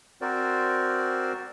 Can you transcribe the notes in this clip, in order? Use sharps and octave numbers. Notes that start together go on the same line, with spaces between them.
C4 F#4 A#4 C5 D5